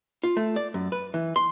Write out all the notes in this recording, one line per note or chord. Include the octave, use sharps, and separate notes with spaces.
F4
A3
D5
F#2
B4
E3
C6